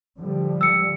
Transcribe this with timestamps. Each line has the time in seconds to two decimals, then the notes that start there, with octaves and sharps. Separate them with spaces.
0.19 D3 F3 G3
0.61 E6 C#7